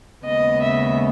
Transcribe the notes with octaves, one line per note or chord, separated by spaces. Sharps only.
D#2 C#3 G#3 B3 D#5
E5